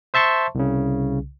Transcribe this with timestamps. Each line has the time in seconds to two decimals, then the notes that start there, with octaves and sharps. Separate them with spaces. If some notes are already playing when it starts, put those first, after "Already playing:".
0.14 C5 E5 A5 C6 C#6
0.55 C2 C#3